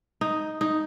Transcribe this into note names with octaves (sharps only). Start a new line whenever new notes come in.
D#4
D#4